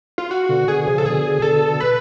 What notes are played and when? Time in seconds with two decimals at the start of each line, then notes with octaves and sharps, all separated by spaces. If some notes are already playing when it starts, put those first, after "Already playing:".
0.18 F4
0.31 F#4
0.49 B2 D3
0.68 B2 D3 G#4
0.86 C#3 F3
0.98 A4
1.05 B2 D3 G#4
1.42 B2 D3 A4
1.81 B4